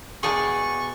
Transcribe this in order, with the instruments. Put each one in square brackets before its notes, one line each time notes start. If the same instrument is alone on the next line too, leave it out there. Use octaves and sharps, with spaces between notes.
[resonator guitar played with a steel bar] E2 B2 A5 [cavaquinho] G#4 D5 [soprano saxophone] C#6